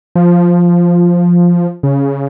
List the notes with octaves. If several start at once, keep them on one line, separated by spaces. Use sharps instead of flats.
F3
C#3